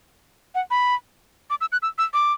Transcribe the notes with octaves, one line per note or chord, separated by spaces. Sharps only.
F#5
B5
D6
E6
F#6
E6
E6
D6